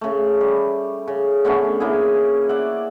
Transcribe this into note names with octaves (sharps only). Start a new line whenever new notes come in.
C#3 A3
G3
C#3
D3 A3 B3 C#4
C#3 A#3 E4 G#4
D5 E5 F#5